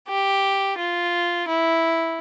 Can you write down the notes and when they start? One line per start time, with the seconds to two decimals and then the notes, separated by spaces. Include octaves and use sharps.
0.08 G4
0.77 F4
1.48 E4